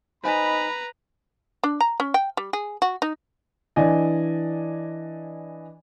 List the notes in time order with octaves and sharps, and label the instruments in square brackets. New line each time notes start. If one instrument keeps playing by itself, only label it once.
[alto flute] D#4 [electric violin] B4 A#5 [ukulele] C5 G#5 [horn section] B5
[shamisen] D4
A#5
C#4
G5
G3
G#4
F#4
D#4
[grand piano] E3 D4 D5 D#5 G#5